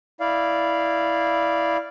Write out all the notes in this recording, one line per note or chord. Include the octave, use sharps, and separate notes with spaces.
E4 D5 F5